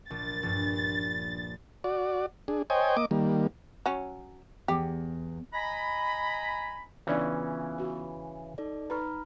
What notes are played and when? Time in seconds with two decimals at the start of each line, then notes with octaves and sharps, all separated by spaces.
0.10 A#1 A6
0.43 A#1 G2
1.84 F#4 D5
2.48 D4 G#4
2.70 C5 C#5 D#5 G5 G#5
2.97 A#3 D#5 D6
3.11 D#3 G3 A#3
3.86 F#3 C#4
4.68 E2 G4
5.53 D#5 G#5 A#5 B5
7.07 C#3 E3 B3 C#4 D4 F4 D5 E5
7.78 F#4 B4
8.58 D#4 A4 D5
8.90 D#4 B4 A#5 B5 F6